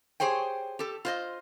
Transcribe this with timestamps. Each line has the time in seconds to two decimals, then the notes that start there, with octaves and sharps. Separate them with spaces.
0.20 G4 G#4 C5 C#5 G5
0.79 G4 A4
1.05 F4 C5 D#5